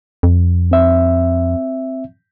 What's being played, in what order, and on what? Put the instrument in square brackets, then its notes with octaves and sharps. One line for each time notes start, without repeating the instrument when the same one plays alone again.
[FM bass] F2
[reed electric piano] C4 E5